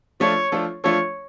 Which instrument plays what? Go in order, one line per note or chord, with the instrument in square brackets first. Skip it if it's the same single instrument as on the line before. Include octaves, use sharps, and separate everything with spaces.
[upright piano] F3 A3 D4 F4 A4 [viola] C#5
[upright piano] F3 A3 D4 F4 A4
[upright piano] F3 A3 D4 F4 A4 [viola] C#5